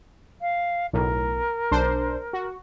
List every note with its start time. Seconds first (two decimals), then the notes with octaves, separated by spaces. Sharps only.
0.41 F5
0.93 B1 A2 A#4
1.71 B1 D4 C5
2.33 F#4